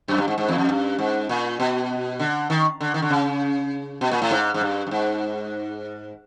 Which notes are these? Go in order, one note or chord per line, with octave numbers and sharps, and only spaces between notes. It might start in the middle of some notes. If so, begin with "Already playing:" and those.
F#2
G2
G#2
G#2
E2
F2
G2
G#2
A#2
B2
D3
D#3
D3
D#3
D3
C#3
B2
A#2
A2
G#2
G#2
G2
G2
G#2